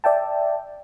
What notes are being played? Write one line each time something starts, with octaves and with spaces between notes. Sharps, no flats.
D5 E5 G5 A5